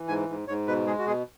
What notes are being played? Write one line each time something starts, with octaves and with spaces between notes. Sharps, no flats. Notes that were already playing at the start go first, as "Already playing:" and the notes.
Already playing: E3
G#2 G#5
G#2
G#2 C#5
B2 B4
G#3 G#4
F#4
B2 G#4